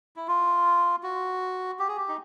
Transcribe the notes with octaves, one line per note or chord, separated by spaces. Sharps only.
E4
F4
F#4
G4
G#4
G4
D#4